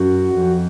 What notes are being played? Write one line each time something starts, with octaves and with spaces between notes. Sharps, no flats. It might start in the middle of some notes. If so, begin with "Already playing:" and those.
Already playing: F#2 F#4
F2